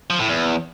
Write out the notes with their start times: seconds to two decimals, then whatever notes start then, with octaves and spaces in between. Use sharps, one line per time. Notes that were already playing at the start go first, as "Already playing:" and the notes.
0.10 F3
0.19 A2
0.28 E2